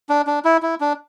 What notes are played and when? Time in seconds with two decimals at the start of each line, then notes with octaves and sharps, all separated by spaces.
0.09 D4
0.27 D4
0.45 E4
0.62 E4
0.80 D4